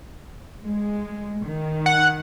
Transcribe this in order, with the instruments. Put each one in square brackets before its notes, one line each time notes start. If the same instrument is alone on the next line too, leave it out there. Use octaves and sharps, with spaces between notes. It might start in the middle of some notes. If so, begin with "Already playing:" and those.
[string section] G#3
D#3
[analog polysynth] F#5